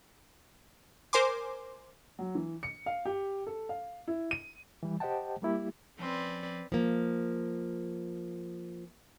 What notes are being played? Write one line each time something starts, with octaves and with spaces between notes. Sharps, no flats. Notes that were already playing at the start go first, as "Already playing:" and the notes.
A#4 C5 G#5 C6 D6
F#3
E3
C#7
F5
G4
A4
F5
E4
D#7
E3 G3
G4 C5 D#5 F#5 G5 A5
G3 A#3 E4 G4
F2 C4 C#4 B4 D5 C6
F3 A#3